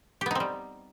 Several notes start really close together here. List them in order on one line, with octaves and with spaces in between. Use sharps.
G4 B3 D#4 C4 G3